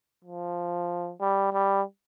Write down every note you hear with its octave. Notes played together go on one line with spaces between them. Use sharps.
F3
G3
G3